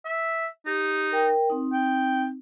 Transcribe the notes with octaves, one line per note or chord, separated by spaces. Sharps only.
E5
D#4 G4
A#4 G5
C4 D#4
G5